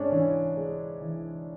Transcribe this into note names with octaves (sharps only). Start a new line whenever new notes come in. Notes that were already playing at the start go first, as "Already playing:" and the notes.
Already playing: G#2 C#4 D4
E3 C#4
G#3
E3